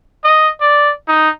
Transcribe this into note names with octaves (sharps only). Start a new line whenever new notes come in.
D#5
D5
D#4